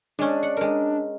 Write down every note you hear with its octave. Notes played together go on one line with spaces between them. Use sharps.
G#3 C#4 D4
F#5
G#3 A#4